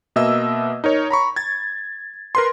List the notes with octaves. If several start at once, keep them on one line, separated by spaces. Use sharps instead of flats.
B2 A#3 D#5 E5 E6
D#4 A#4 C#5
A#5 B5 C#6
G#6 A6
A#4 B4 C6